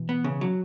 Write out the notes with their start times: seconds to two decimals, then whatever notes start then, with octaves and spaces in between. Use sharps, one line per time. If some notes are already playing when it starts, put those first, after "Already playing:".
Already playing: B2 E3
0.09 B3
0.24 C#3
0.41 F#3